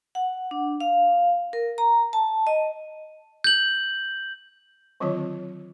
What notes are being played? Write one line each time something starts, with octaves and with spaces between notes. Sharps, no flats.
F#5
D4
F5
A#4
A#5
A5
D#5
G6 F#7
D3 D#3 F#3 C4 F4 C#5